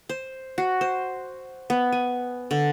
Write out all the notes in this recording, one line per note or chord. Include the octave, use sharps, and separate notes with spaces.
C5
F#4
C5
B3
G#5
D3